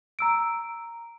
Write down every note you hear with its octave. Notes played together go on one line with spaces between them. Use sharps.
A#5 E6 D7